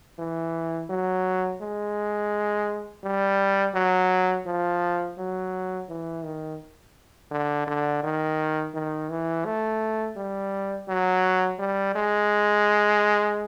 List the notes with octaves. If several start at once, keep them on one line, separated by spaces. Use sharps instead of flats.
E3
F#3
G#3
G3
F#3
F3
F#3
E3
D#3
D3
D3
D#3
D#3
E3
A3
G3
F#3
G3
G#3